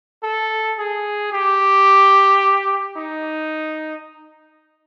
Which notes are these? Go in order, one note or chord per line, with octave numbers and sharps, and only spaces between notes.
A4
G#4
G4
D#4